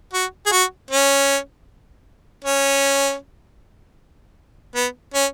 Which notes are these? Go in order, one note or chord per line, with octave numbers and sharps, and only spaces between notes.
F#4
G#4
F#4
C#4
C#4
B3
C#4